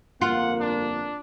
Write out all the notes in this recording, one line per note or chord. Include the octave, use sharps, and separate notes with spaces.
G1 F2 A#3 F4 F#5
D4